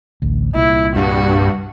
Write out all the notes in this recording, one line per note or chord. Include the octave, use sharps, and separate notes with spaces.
A1 D2
C2 A#2 E4
G2 F#4